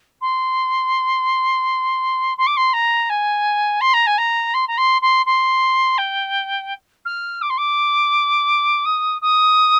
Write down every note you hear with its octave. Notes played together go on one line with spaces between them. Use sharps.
C6
C6
D6
C6
A#5
G#5
C6
A#5
G#5
A#5
C6
A#5
C6
C6
C6
G5
F6
D6
C6
D6
D#6
D#6